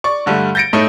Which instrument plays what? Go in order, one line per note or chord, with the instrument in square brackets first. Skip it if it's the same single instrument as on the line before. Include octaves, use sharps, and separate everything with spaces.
[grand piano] D5 C#6
G2 D3 G3 A3
G6 A6 A#6 C#7 D7
A2 A3 D#4